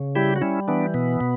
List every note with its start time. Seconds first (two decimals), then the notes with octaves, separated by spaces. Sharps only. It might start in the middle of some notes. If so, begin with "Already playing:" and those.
Already playing: C#3
0.15 G3 E4 G4
0.36 F#4
0.41 G3 C#4 E4
0.68 E3 B3 D4
0.94 B2 B3
1.21 B2